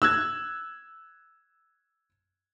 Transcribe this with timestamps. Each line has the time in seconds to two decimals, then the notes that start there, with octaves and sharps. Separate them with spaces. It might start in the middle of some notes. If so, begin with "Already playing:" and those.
0.02 E6 F#6 G#6